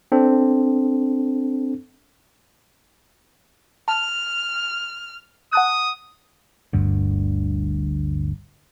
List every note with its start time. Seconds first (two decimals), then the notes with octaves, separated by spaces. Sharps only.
0.12 C4 D4 A4
3.88 A5 F6
5.53 F#5 A5 D#6 F#6
6.73 G1 D2 G2 D3